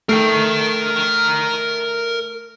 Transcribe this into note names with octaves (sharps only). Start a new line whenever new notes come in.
A3 A#4 G5 C7